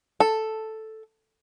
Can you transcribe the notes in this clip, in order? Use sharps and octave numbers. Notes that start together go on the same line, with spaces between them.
A4